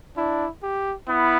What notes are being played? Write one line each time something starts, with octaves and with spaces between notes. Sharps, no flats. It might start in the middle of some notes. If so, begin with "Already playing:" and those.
D4 E4
G4
B3 E4